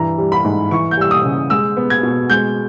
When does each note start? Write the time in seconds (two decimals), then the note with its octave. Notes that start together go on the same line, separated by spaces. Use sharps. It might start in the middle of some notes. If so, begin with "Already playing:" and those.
Already playing: G2 E3 A#5
0.18 G3
0.32 B5
0.44 G#2
0.71 E3 C#6
0.91 G6
0.97 G3 E6
1.11 D#6
1.24 C#3
1.50 G#3 E6
1.77 B3
1.90 G#6
2.03 B2
2.30 G#3 G6